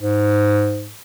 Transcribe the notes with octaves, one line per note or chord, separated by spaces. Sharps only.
G#2